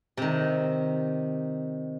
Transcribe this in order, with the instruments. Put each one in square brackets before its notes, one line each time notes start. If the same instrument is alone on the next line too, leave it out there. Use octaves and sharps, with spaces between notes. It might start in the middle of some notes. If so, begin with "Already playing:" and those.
[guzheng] C3 D#3